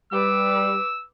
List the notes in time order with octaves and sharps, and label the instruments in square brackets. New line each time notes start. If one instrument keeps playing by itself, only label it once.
[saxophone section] G3 [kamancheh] B4 D6 [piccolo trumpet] E6